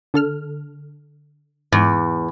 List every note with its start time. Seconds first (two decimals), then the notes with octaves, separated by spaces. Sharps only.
0.14 D3 A4 F6
1.72 E2 G#2